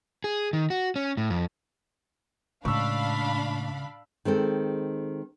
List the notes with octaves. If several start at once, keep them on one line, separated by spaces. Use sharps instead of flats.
G#4
D#3
F#4
C#4
A2
F2
C#2 A2 D4 F5 B5 C#6 E6
D#3 G#3 C4 A4